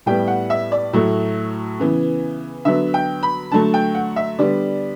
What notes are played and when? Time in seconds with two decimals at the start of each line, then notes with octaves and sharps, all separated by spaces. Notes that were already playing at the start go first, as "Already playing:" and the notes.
0.06 A2 G3 B3 G5
0.27 F#5
0.50 E5
0.72 D5
0.93 A2 F#3 A3
1.79 C#3 E3 B3
2.65 D3 F#3 B3 E5
2.94 G5
3.23 B5
3.52 D3 F#3 A3 A5
3.74 G5
3.95 F#5
4.16 E5
4.38 D3 G3 B3 D5